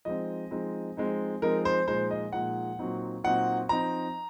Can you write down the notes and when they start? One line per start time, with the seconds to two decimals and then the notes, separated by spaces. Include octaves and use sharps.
0.05 F3 G#3 C4 D#4 D#5
0.51 F3 G#3 C4 D#4
0.97 F3 G#3 C4 D#4
1.42 F3 G#3 C4 D#4 A#4
1.65 C5
1.88 A#2 F3 G#3 D#4 C5
2.11 D#5
2.32 A#2 F3 G#3 D#4 F#5
2.79 A#2 F#3 C4 D#4
3.24 A#2 F#3 C4 D#4 F#5
3.69 F3 C4 D#4 A#5